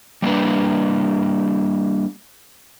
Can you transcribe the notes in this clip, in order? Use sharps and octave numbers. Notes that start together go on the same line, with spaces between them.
G3 A#3 D4 B4